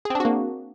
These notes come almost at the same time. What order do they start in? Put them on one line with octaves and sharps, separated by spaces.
G#4 C4 D4 F#4 A#3